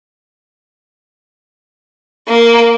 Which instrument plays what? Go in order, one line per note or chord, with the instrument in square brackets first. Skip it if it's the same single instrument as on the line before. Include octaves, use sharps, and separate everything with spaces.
[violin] A#3